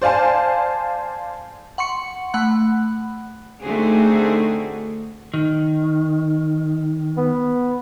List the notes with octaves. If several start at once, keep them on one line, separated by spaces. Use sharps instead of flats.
C5 D5 F5 G#5 A5
F#5 C6 C#6 C#7
A3 F#5 B5 F#6
D3 A3 C4 D#4 F#4 G#4
D#3
B3